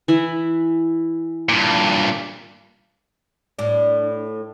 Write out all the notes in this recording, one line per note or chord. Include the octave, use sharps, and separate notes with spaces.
E3 E4
G2 A#2
A2 D4